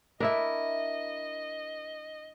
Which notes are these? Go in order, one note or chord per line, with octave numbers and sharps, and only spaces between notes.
D4 E4 A#4 D#5 E5